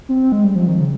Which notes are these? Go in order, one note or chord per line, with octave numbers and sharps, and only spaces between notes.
C4
G#3
G3
F3
D#3
C#3